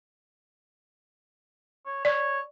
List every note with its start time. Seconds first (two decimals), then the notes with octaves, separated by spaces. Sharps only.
1.86 C#5
2.05 C#5 D5